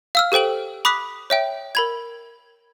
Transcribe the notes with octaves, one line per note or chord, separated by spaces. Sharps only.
F5 E6 F6
G4 A4 C5 G5 F#7
B5 D6 D#6 F#6 B6
C#5 E5 G5
A#4 B5 G#6